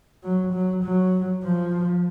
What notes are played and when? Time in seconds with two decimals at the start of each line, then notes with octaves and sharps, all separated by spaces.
0.23 F#3
0.53 F#3
0.83 F#3
1.43 F3